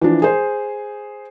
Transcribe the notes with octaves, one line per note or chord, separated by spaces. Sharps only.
E3 F3 D4
G#4 C5